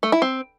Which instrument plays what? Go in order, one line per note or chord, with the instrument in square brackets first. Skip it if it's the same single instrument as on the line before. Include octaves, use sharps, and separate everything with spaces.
[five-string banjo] A3
E4
C4